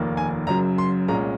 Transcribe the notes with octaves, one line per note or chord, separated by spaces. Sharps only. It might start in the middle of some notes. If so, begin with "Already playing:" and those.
Already playing: F1 D#2 D#3 A#3
G#5
F#1 F#2 C#3 F#3 A#5
C6
C2 A#2 G#3 C#4 A#5